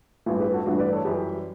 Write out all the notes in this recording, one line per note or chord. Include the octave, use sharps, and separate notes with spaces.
A1 G2 E3
G4 B4
F#4 A4
A1 G2 E3 D4 F#4
B4 D5
A4 C#5
F#2 E3 G3 G4 B4